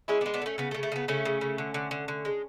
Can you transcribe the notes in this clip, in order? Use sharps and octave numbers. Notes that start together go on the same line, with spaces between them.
G#3 C#4 E4
B3 D4
G#3
B3 D4
D3
A3 C#4
C#3 B3
A3
C#3
A3
C#3 B3
C#3 A3 C#4
C#3
C#3
D3
D3
D3
D3
G#3